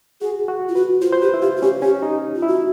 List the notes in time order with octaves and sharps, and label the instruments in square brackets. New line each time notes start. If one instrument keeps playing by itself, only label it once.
[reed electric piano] F#4 [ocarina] G#4
[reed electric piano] F#4
[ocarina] F4
[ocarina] F#4 [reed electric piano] B4
[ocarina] F4 [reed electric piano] C5
[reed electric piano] C5
[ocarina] G4 [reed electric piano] B4
[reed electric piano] E4
[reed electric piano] F4 [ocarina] G4
[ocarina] F#4
[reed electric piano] C#4 [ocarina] G4
[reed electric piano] C#4 [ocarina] G4
[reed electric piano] D#4
[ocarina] F4
[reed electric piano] E4
[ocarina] F#4